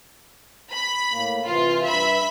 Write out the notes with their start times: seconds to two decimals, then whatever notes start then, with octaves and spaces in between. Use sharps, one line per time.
0.71 B5
1.12 A2 A#3
1.47 C3 E3 F4
1.84 G2 E5 B5 B6